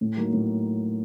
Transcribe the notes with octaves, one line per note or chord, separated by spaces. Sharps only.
A2
F#3 A#3 D#4
A2